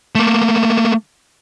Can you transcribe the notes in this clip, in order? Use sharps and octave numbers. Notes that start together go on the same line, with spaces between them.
A3 A#3